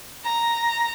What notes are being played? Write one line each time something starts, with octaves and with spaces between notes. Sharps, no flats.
A#5